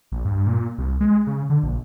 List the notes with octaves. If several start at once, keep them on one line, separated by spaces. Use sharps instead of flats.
A#1
G2
A#2
C2
G#3
C#3
D3
A#1